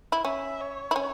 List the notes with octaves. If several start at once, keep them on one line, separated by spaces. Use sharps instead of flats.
E4
C#4 E5
C#5
E4
C#4